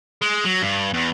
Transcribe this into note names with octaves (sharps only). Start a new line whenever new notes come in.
G#3
F#3
G2
E2